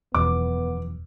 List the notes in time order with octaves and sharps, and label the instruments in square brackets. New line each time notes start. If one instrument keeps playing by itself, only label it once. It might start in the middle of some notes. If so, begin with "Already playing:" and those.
[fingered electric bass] E1 [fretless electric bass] F#2 E3 F3 [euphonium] B3 [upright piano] D6